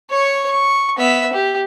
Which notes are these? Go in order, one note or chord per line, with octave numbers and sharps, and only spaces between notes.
C#5 C#6
C#6
B3 E5
G4